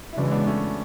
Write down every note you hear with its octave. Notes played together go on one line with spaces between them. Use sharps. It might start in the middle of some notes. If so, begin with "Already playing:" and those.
E4
C#3 E3 G#3 D4 F#4
B3 D4
A3 C#4